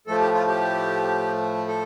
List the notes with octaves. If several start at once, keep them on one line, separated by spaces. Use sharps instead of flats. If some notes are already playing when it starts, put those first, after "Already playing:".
A2 F3 A3 A4
G4
F4
G4
A4